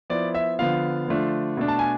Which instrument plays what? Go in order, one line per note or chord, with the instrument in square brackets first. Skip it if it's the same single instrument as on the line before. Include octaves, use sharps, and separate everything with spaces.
[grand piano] F3 B3 E4 D5
E5
D3 F3 B3 F4 F5
D3 F3 A3 D4 F4
B2 A3 D4
A5
G#5